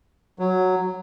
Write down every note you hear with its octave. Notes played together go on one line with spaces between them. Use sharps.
F#3